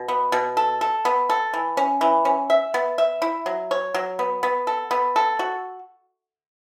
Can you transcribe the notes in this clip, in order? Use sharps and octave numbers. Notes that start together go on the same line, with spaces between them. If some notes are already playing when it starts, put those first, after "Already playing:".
Already playing: B2
B3
B2
A4
A4
B3
A4
E3
C#4
E3
C#4
E5
B3
E5
E4
F#3
C#5
F#3
B3
B3
A4
B3
A4
F#4